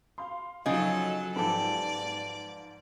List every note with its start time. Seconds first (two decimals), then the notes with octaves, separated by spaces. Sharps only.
0.18 F5 C6
0.66 C#3 F3 F#3 D#4 F4 A4 D#5
1.36 G#2 F3 G4 A4 B4 D5